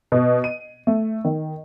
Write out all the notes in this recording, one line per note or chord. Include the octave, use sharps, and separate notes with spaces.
B2
D#7
A3
D#3